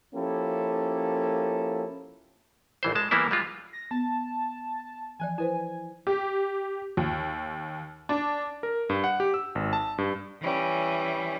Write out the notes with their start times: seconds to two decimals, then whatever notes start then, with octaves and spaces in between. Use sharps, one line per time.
0.14 F3 A#3 C#4 E4 G4 A4
2.83 A#1 E3 C5
2.95 G#3 A5
3.11 E3 G3 A#3 B3 E4
3.31 G3 G#3 F4
3.73 A#6
3.91 B3 A5
5.20 E3 F3 D5 G#5
5.38 E4 B4 C5 G#5
6.07 G4
6.97 D#2
8.09 D4
8.63 A#4
8.89 G2
9.04 F#5
9.20 G4
9.34 E6
9.55 G#1
9.73 A5
9.98 G2
10.41 E3 G3 C#4